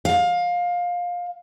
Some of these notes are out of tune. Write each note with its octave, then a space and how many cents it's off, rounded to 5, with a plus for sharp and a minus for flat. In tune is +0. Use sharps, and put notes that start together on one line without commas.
F5 +20